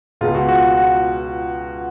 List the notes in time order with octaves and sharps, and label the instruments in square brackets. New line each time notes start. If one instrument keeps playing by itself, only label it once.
[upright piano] C#2 B2 G#3 [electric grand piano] F4
[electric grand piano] F#4
F#4
F#4